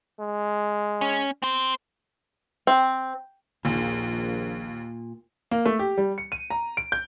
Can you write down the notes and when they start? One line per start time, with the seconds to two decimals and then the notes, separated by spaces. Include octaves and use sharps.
0.20 G#3
1.01 C#4
1.43 C4 C5
2.67 C4
3.65 A#1 D#2 A#2
5.51 A#3
5.66 A3
5.79 G4
5.97 G3
6.18 C#7
6.32 D#7
6.50 A#5
6.77 D7
6.92 G6